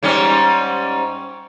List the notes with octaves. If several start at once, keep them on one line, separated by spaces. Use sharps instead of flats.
G#2 G3 C#4